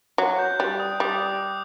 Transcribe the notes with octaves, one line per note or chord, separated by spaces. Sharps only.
F#3 F#6
G6
G3 F#6
D#6
G3 D6
D#6